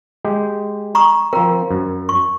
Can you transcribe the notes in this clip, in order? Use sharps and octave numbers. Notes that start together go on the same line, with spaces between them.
G#3 G4
A#5 C#6 D#6
F3 C4 A#4 A#5
F#2
C#6